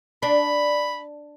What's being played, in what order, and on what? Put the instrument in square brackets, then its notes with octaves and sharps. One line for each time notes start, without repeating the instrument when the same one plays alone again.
[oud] D4 [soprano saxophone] B5